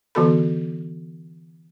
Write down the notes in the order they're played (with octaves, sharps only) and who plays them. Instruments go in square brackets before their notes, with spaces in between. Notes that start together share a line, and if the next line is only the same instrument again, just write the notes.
[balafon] D3 E3 B3 F#4 A4 B5